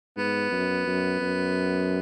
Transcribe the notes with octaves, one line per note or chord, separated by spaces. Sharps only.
G#2 B3
F#2
F#2
F#2